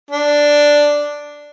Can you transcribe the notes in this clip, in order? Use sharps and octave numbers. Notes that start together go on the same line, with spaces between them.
D4